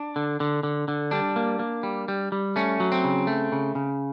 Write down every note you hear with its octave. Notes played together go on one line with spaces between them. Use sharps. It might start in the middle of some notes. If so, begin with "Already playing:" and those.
Already playing: D4
D3
D3
D3
D3
G3 D4
A#3
A#3
G3
G3
G3
A3 C#4
F#3
C4
C#3
A3
C#3
C#3